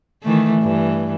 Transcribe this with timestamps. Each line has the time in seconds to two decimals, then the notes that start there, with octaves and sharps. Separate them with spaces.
0.23 D#3 E3 A3
0.62 G2 E3